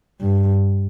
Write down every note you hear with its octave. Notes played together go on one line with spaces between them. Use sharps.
G2